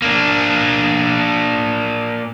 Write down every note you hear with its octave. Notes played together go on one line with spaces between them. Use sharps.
A#3 D4